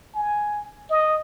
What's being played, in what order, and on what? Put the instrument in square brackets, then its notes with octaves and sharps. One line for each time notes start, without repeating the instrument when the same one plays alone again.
[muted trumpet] G#5
D#5